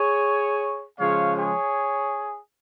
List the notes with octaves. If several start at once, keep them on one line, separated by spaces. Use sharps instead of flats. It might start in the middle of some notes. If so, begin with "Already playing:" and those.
Already playing: G#4 C#5
C#3 F3 G#3 C#5 F5
G#4 C#5